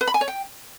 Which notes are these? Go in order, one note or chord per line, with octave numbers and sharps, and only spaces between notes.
B4
B5
G#5
C#5
G5